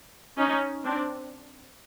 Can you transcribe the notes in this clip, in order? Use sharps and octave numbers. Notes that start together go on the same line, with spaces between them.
C#4 D#4
C4 D4